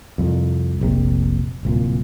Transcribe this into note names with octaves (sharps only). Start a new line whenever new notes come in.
C2 F2
F1 A#1 C3
D1 C2 A#2